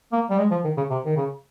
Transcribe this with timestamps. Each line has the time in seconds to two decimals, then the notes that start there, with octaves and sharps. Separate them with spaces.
0.12 A#3
0.30 G3
0.38 G#3
0.51 F3
0.64 D#3
0.77 C#3
0.90 C3
1.05 D#3
1.17 C#3